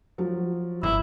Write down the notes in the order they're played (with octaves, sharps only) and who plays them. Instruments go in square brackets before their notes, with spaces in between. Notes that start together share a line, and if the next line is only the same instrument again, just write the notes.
[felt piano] F3 F#3
[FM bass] G1 [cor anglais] E4